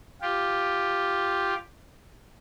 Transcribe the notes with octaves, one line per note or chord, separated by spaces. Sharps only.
F4 G4